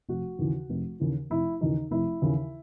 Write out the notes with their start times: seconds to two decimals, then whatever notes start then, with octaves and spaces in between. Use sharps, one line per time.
0.09 F1 F#4
0.39 D#2 C#3 E3
0.70 F1
1.00 D#2 C#3 E3
1.30 F1 E4
1.61 D#2 C#3 E3 D#4
1.91 F1 E4
2.22 D#2 C#3 E3